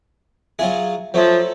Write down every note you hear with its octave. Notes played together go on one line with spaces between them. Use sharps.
F#3 F4 G#4 E5
F3 F#3 A3 C5 C#5